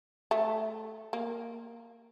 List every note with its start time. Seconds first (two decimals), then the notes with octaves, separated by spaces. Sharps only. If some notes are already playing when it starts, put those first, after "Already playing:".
0.31 A3
1.13 A#3